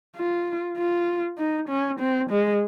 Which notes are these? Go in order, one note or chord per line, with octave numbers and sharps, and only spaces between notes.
F4
F4
D#4
C#4
C4
G#3